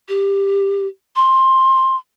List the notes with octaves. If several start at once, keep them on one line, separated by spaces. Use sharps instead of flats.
G4
C6